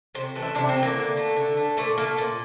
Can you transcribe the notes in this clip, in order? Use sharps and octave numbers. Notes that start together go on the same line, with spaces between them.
C3 C5
E3 A3
E4
C3 D4
C4
E3 A3
A#3
D3
A3
D3
A3
A#2 A3
A3 A#3
A#2